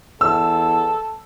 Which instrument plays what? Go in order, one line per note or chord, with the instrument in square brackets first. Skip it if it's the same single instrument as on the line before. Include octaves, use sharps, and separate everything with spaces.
[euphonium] E2 [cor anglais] A4 [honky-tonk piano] E6